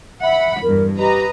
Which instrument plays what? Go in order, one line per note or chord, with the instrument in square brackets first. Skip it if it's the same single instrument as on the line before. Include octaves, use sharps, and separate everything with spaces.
[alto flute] E5 [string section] F#5 B5
[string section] E2 G2 [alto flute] A#4
[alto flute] G4 [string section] B4 D#5 A#5